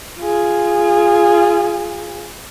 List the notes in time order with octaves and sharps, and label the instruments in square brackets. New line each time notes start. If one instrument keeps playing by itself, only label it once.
[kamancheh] F4 G#4